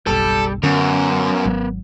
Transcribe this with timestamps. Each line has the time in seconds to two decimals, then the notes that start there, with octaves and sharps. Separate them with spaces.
0.07 F#1 B1 G3 A4
0.63 F#2 D3 B3 C#4 A#4
1.45 G#1 F#3